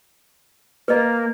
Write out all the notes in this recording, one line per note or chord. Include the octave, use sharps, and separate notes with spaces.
A#3 B4 D#5